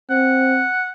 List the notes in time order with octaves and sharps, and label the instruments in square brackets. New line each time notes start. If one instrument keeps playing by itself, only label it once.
[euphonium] C4 [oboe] F#5